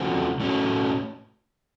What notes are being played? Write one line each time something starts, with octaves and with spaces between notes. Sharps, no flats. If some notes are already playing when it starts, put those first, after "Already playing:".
Already playing: C#3 F3 A3 C4 F#4
A2 A3 C#4 F#4